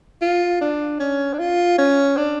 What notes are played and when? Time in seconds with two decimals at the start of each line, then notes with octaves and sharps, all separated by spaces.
0.22 F4
0.61 D4
1.00 C#4
1.33 D4
1.39 F4
1.78 C#4
2.17 D4